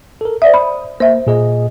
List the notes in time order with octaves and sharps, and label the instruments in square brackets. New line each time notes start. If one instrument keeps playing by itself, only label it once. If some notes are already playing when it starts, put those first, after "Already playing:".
[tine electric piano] A4 A#4
[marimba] C5 D5 E5 [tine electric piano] D#6
[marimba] B5
[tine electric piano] A#3 [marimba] C5 E5
[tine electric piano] A#2 G#4 D#5